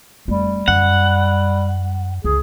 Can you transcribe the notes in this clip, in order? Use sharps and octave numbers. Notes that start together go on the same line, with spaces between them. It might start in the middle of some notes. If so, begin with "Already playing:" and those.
F2 G3 A3
F#2 F#5
C#2 G#4